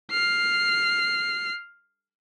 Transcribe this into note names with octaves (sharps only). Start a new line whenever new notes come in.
F6 C7